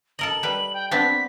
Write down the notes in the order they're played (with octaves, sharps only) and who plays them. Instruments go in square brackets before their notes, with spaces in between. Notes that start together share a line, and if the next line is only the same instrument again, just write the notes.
[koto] A4 A#4 D#5 [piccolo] F#7
[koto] G3 B4
[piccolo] G5
[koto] B3 C4 D4 [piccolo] B6